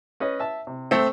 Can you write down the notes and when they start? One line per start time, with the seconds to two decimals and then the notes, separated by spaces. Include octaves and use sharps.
0.20 C#4 B4 D#5
0.40 E5 A5
0.67 C3
0.91 A3 C4